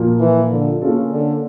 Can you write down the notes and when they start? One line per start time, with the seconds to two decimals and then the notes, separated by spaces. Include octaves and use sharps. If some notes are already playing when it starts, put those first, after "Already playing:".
Already playing: A#2 F3 A#3
0.20 E3
0.51 D3
0.82 C#3 A#3 C#4 F4 A4
1.12 D3